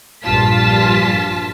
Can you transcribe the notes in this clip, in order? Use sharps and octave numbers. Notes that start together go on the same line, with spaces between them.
A#1 G2 F4 A5 B6